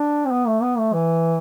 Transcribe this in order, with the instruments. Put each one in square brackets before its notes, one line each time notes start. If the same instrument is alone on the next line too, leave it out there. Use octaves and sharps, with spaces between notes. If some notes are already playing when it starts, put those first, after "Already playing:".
Already playing: [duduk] D4
C4
B3
A3
B3
A3
E3